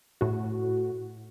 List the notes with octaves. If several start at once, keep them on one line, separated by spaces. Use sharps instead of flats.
A2 F#4